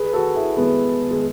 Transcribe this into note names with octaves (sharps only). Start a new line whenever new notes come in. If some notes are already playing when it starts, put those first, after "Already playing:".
Already playing: G#4 B4
F#4 A4
E4 G#4
G#3 B3
G#3